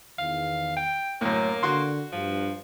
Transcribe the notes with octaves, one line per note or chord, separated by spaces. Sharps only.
E2 D#3 F5
G5
F#2 A2 A#3 C#5
D3 F#4 C6
G2 F3